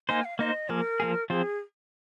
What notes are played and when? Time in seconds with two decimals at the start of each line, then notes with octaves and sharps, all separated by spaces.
0.09 A#3 D#4 C5 G#5
0.24 F5
0.39 A#3 D#4 C5 D#5
0.69 F3 A#3 G#4 A#4
1.00 F3 A#3 G#4
1.30 F3 C4 F4 G#4 C5